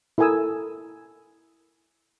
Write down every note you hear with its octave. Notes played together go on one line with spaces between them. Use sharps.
E4 A4 A#4 G#5 D#6 E6